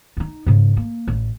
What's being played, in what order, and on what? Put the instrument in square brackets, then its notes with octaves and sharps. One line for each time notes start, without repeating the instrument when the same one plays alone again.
[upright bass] D#4 E4
G#2 C#3
A#3
A1